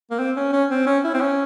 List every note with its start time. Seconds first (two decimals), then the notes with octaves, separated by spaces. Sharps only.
0.10 A#3
0.19 C4
0.36 C#4
0.52 C#4
0.70 C4
0.86 C#4
1.04 E4
1.14 C4
1.21 C#4